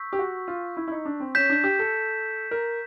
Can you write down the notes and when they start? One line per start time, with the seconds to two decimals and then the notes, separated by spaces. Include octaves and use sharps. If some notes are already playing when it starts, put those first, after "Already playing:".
Already playing: C#6 E6 G6 B6
0.13 G4
0.19 F#4
0.48 F4
0.77 E4
0.87 E4
0.91 D#4
1.05 D4
1.20 C4
1.35 C#4 G6 B6 E7
1.50 D4
1.64 G4
1.79 A4
2.51 A#4